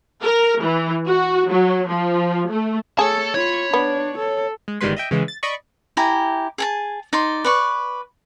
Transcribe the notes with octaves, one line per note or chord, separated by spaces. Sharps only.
A#4
E3
F#4
F#3
F3
A3
A3 G#4 A4 C#5 A5
F4 C#5 B5
B3 D4
A4
G#3
G1 D#3 G3 G#3 B4 C6
D#5 E5 G5
C#3 E3 G#3
A6
D5 D#5 B5 C#6
E4 G4 G#5 A#5
G#4 G#5 A5
D#4 D5 C6
B4 D5 C#6